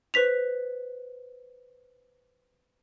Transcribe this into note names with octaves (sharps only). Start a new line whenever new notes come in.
B4 C5 B6 F7